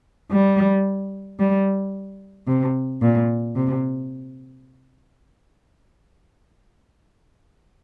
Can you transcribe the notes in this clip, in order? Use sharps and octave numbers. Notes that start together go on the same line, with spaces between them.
G3
G3
C3
A#2
C3